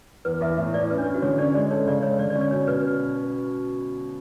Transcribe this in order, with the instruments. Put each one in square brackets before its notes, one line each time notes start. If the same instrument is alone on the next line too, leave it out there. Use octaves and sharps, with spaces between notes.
[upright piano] E2 [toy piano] B4
[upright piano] E2 [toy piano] E5
[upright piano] A2 [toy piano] E5
[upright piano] E3 [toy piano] D5
[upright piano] C#4 [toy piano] B4
[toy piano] D4
[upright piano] C#4 [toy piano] E4
[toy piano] F#4
[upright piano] D3 [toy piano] C#5
[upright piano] C#4 [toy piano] D5
[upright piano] G#3 [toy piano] D5
[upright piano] A4 [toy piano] C#5
[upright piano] C#3 [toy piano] D5
[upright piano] G#3 [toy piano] C#5
[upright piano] D3 [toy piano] D5
[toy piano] D5
[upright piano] C#4
[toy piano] D5
[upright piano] B2 [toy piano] C#5
[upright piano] B2 [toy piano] B4